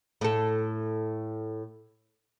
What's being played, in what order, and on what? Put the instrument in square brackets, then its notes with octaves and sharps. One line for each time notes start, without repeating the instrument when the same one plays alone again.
[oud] A2 A4